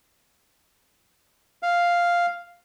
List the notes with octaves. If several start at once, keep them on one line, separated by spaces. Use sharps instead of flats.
F5